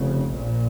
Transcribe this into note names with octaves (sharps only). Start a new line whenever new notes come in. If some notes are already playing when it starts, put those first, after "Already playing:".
Already playing: F1 F2 C#3
A#1 A#2